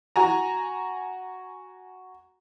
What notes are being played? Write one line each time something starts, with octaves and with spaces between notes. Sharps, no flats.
F#4 G#5 A#5